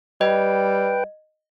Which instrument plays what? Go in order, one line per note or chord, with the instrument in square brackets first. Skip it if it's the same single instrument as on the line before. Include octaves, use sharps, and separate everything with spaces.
[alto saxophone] G3 [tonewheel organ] B4 G5 [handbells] D#5